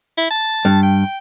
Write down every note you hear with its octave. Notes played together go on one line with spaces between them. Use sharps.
E4
A5
G2
G5